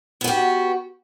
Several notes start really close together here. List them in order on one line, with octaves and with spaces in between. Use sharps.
B3 F#4 G4